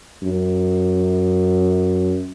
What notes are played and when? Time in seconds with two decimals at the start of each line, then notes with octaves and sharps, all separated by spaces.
0.22 F#2